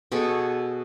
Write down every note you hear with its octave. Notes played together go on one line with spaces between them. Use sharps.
B2 G#4 A4 C#6